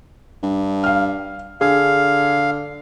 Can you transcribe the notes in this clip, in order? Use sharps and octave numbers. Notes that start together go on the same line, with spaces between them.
G2
F5 F6
D3 G#4 F5